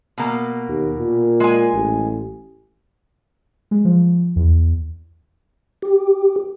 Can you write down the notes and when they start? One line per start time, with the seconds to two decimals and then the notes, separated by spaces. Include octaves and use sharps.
0.18 B2 A#3
0.68 D#2
0.98 A#2
1.40 G#3 G#5
1.74 A1
3.71 G#3
3.85 F3
4.36 E2
5.82 G4